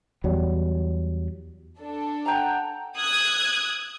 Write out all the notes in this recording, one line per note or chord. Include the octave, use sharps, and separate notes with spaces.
E2 F#3 G3
D4 A4
F#5 G5 A5 A#5
D#6 E6 F#6 G#6